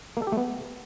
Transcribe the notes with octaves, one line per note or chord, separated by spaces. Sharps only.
A#3
A4
G4
A3
B3